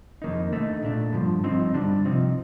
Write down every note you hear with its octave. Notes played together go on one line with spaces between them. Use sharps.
F2 D#3 A#3 D#4
D3 A3 D#4
A#2 A3 D4
G2 D3 F3
G2 F3 C4 D#4
G2 D3 G3 D4
C3 F3 C4 D#4